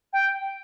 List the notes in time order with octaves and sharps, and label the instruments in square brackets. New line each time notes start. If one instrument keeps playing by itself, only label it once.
[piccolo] G5